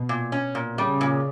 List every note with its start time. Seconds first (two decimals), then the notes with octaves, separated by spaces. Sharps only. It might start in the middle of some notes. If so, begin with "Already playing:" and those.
Already playing: B2
0.09 A#2
0.32 C#4
0.55 A#2
0.77 C#3 G3
1.01 A#2